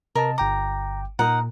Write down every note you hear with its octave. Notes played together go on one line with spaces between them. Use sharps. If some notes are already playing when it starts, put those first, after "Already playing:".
C3 A#4 D#5 A5
G1 G5 A#5 D6
A#2 D#4 A#4 F#5